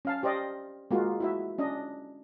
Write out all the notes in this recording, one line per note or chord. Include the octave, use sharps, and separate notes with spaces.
C#4 F5 A5
G4 C5 D5 D#5
G#3 A#3 F4 F#4
E4 F#4 E5
C#4 D4 D#5